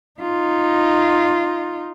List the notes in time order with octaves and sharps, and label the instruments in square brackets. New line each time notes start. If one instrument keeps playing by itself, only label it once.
[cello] D#4 F4